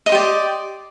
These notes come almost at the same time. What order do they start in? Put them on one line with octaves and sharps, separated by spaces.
D#5 C6 G4 D5